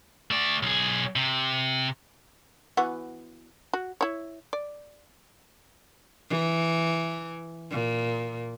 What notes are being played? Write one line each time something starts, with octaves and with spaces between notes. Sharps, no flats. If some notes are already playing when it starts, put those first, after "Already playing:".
A3 D5
B1 G#4
C3
E3 B3 F#4
F#4
E4 C#5
D5
E3
A#2